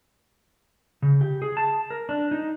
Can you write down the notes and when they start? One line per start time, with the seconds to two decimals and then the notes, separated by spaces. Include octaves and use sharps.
1.02 C#3
1.21 G4
1.42 G#4
1.57 A5
1.90 A#4
2.09 D4
2.31 D#4